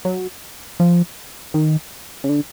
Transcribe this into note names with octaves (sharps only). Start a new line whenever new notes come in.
F#3
F3
D#3
C#3
D3